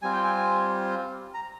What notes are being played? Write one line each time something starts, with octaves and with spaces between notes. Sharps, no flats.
G3 C4 F4 G#5
G5
G#5
A#5